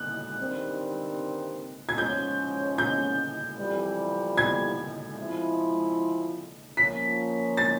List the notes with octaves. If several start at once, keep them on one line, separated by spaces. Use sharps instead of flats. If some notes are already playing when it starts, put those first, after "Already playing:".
Already playing: F#6
G2 D#3 G3 C4
G#6
G#2 F3 G#3 C#4 G6
G6
F2 C3 E3 G3
G#6
F3 G#3 C4 E4
F3 A#3 C#4 B6
A6